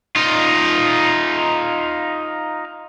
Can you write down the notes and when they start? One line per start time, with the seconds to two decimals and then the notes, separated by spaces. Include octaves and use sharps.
0.16 D#4 F4